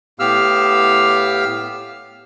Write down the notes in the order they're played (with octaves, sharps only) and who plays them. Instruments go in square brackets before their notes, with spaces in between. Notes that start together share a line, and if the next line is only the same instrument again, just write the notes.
[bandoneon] A2 B3 G4 F5 E6 F6